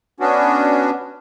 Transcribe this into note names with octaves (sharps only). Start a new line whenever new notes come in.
B3 C#4 D4 F#4